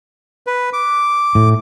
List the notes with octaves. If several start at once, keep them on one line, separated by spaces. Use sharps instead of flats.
B4
D6
A2